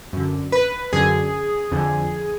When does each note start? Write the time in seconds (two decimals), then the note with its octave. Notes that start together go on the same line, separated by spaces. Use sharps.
0.13 F#2 D3
0.52 B4
0.92 F#2 D3 G#4
1.71 F2 D3